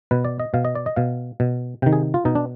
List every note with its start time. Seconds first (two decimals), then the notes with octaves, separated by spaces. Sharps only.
0.11 B2 B4
0.25 D5
0.40 D#5
0.54 B2 F5
0.65 D#5
0.75 D5
0.86 D#5
0.96 B2 F5
1.40 B2
1.82 C3 D#3 G5
1.93 G#4
2.14 F4
2.25 B2 D#4
2.35 D4